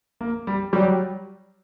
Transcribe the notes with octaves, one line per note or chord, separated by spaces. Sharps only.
A#3
G3
F#3 G3